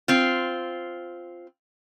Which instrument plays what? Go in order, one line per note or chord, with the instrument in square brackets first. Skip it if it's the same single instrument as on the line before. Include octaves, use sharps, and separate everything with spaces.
[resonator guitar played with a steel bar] C4 F4